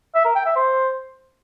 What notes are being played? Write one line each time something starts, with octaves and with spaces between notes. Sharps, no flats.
E5
A#4
G5
E5
C5